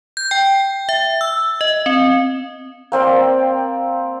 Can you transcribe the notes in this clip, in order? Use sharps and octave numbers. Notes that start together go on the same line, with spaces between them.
G6
G5
E5
E6
D#5
C4
A#3 C4 D5 G5